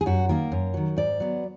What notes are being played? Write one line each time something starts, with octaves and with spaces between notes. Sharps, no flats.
G#4
F#2 F#4
D#3 A#3 A#4
F#2
D#3 F#3
G#2 D5
F#3 B3